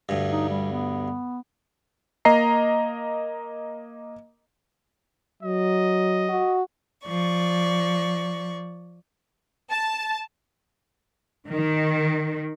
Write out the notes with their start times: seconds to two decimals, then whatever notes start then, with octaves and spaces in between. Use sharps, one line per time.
0.09 D2 G2
0.30 D#4
0.49 G3
0.72 B3
2.25 A#3 D#5 A#5 C7
5.43 F#3 D#5
6.29 F#4
7.06 F3 D5 C#6
9.70 A5
11.50 D#3